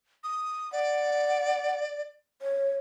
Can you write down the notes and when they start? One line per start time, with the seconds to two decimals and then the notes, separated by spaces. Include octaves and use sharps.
0.24 D#6
0.72 D5 F#5
2.42 C#5